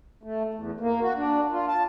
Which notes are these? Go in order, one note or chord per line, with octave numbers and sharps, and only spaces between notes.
A3
E2
A#3
F#4
D4
F4
A5